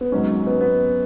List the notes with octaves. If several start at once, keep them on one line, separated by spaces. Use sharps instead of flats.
B3
G#1 G#2 F#3 C#4
B3
B3